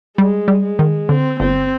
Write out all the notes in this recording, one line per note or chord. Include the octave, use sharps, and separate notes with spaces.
G3 G#3
G3
G#3
D#3
D3 C4
G1 C4